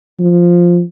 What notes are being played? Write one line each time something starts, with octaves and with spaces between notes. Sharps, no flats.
F3